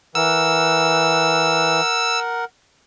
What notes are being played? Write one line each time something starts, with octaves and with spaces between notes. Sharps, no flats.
E3 A#4 F#5 E6